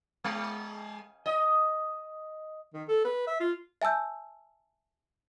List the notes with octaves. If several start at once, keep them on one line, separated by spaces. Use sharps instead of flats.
G#3
D#5
D#3
A4
B4
E5
F4
E5 G#5 A5 E6 G6